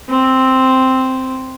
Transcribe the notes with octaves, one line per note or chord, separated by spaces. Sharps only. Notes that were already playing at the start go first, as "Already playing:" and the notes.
C4